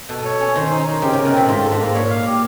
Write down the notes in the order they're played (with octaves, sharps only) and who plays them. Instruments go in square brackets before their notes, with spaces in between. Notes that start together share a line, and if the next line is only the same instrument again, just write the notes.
[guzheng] B2 [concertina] A4
[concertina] C#5
C#4
[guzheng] D#3 [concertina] C5
[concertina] D#4
D#4
[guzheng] C#3 [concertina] G4
[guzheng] C3 [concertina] A#4
[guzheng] B2
[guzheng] A2 [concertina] C4
[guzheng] G#2 [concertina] F4
[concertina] A4
[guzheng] G#2
[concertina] A#3
[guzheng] A#2 [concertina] C#5
[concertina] F5
G4